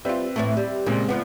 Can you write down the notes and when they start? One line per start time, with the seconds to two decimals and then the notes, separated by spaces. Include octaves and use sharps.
0.05 G3 C4 F4 B4 E5
0.36 A2 E3 A3
0.57 G3
0.86 A#2 C#3 G#3 C4
1.09 D2 F3 B3